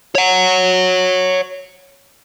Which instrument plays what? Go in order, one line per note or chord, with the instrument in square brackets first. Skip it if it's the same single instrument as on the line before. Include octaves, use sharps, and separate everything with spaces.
[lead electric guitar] C#5 F#5